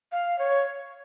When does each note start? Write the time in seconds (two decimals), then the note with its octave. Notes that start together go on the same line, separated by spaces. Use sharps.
0.12 F5
0.39 C#5